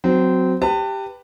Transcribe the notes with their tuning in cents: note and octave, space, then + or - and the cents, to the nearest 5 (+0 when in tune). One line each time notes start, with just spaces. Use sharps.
F#3 +0 C4 -20
G4 +0 B4 +0 A5 +35